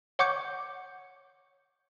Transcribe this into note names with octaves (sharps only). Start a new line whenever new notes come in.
C#5 F#5 C#6 D6 G6 C#7